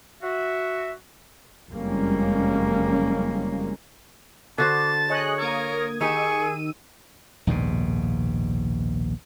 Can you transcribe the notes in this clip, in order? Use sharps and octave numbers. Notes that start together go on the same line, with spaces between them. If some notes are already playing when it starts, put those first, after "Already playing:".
F#4 E5
F#1 F2 G3 G#3 A#3 C#4
D3 F#4 C5 A5 D6
G#4 C#5 D#5 F#6
A#3 A#4 D#6 G#6
D#3 D#4 G4 G#4 C#6 E6 D#7
A#1 D#2 G#2 B2